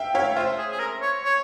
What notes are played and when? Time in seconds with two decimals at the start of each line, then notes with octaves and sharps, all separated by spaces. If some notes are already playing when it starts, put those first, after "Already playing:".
Already playing: E5 F5 G5
0.14 E4 C#5 F5
0.36 F4 C5 E5
0.58 G#4
0.71 G#4
0.80 A#4
1.02 C#5
1.25 C#5